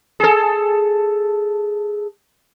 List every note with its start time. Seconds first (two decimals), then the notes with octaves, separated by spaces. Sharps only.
0.20 G#4 A4